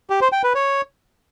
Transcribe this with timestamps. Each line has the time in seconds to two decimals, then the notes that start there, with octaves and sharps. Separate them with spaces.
0.10 G4
0.21 C5
0.32 G5
0.43 B4
0.55 C#5